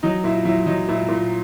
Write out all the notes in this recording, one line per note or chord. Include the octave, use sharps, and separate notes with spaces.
F#3 D#4
A#2 E4
F#3 E4
F#3 D#4
A#2 E4
A#2